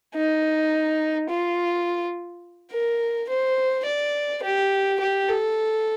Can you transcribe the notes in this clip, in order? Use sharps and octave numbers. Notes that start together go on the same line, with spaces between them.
D#4
F4
A#4
C5
D5
G4
G4
A4